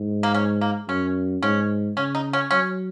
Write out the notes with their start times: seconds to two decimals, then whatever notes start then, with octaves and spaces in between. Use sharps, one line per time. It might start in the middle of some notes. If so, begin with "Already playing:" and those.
Already playing: G#2
0.23 A#3
0.35 C#4
0.61 A#3
0.88 F#2 C#4
1.42 G#2 C#4
1.97 C#3 C#4
2.15 D#4
2.33 C#4
2.51 F#3 C#4